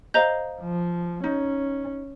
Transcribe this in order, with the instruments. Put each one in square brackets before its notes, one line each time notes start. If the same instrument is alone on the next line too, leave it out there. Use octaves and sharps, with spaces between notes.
[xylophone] C5 A#5 G6 [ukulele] D#5 F5
[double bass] F3
[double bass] C#4 [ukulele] D#4